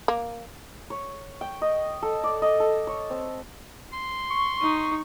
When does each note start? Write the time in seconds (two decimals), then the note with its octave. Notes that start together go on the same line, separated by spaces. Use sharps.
0.08 A#3
0.90 C#5
1.41 G5
1.62 D#5
2.03 A4
2.24 D5
2.42 D#5
2.60 A4
2.87 C#5
3.10 C4
3.93 C6
4.30 C#6
4.61 D#4